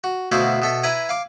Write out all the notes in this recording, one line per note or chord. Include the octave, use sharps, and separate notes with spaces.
F#4
D2 B2 E4 F#4 C5 F5
B2 A4 E5
E4 B4 G#5 A#5
F5 D6